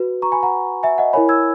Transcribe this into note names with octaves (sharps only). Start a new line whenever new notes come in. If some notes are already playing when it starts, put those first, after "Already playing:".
Already playing: F#4 B4
A#5 C#6
G#5 B5
F#5 A#5
E5 G#5
D#5 F#5
E4 A#4 C#5 G#5 B5
E6 G#6